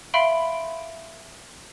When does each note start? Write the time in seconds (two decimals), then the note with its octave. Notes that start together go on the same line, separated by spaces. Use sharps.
0.14 E5 F5 B5 C6 D7